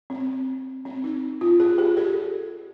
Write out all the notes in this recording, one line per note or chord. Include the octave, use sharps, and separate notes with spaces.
C4
C4
D#4
F4
G#4
G4
A4